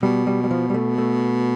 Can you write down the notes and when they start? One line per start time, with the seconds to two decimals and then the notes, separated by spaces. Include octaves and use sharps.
0.03 B2 G3
0.27 G3
0.44 G3
0.51 F3
0.70 G3
0.74 A3
0.98 A3